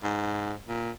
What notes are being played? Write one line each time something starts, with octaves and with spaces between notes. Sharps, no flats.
G#2
A#2